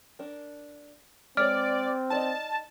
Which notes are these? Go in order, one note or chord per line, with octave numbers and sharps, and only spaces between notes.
D4 A#4
G#3 C4 G#4 C#5 D5 F6
D#4 D5 D#5 A5